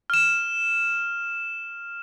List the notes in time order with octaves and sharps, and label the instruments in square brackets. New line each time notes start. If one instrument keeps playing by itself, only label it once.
[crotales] F6 E7